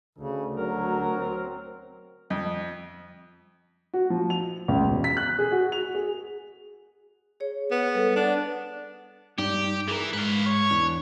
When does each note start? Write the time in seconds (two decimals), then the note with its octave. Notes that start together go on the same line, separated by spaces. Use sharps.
0.18 D2 C#3
0.57 F#3 A#4
1.16 C4
2.30 F2
3.94 F#4
4.10 F3
4.30 F7
4.68 C#2
4.84 E1
5.04 B6
5.17 F#6
5.39 G#4
5.52 F#4
5.72 F7
5.95 G#4
7.40 G#4 C#5
7.71 B3
7.94 G3 A4 A#4
8.16 D4 F#5
9.38 G2 D#4 G4 D5
9.88 E3 G#4 A#4
10.13 G#2 B4 F5
10.46 C#5
10.71 E2 E3 D4